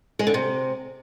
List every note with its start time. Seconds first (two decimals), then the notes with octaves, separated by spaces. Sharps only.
0.19 G#3
0.27 D3
0.34 C3